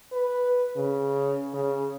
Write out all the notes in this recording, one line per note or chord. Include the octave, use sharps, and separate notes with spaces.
B4
C#3
C#3